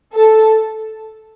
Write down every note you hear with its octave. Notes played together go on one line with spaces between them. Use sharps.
A4